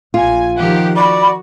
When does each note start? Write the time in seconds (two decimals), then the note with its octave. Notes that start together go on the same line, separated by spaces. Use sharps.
0.14 A#1 F4 G#5
0.57 D#3 F3 G4 F#5
0.96 F#4 D5 B5